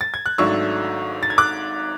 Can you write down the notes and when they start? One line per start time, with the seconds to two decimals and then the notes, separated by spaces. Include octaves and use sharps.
0.01 A6
0.14 G#6
0.26 F#6
0.38 G#1 G#2 F#3 A3 D4 C#6 E6
1.23 A6
1.30 G#6
1.38 D6 F#6